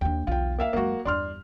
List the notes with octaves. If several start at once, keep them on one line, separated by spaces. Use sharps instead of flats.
D#2 D4 G5
B1 E2 F4 G5
A#3 E5 F5
F#2 G#3 A#3 F#4
E2 G2 D4 C6 F6